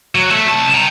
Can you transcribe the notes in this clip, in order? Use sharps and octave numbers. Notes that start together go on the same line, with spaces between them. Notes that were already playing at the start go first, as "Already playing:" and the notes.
F#3
A3
C2 A5
G5 A#5